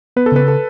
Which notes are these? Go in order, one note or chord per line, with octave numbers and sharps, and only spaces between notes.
B3 B4
A4
C#3 B4
A4